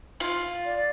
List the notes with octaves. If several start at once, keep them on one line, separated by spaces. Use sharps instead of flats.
F4
D5